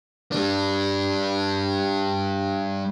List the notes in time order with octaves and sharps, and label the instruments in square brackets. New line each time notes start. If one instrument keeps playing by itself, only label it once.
[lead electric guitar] G3 D4